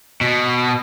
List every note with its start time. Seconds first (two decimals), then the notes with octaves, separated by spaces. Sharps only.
0.21 B2